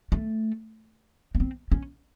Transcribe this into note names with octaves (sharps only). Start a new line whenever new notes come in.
A3
A#3
C4
C#4